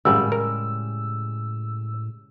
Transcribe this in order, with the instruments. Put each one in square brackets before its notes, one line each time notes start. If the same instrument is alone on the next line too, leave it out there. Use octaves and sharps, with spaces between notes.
[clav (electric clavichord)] G#1 F#2 [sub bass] A2 [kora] C#3 G3 G#3 [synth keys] E6
[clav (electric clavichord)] A#4